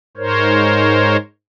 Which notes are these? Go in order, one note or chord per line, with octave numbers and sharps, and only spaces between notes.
G#2 A#4 C5 C#5